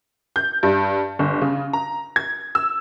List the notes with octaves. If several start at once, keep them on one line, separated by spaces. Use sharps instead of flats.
G6
G2
G1
C#3
A#5
G#6
E6